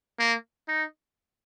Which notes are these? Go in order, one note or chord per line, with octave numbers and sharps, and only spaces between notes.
A#3
D#4